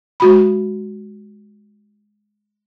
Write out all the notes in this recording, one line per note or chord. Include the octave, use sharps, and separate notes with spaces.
G#3 F#4 B5